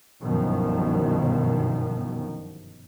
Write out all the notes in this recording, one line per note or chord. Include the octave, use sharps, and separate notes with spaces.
G1 C2 F#2 B2 D#3 F3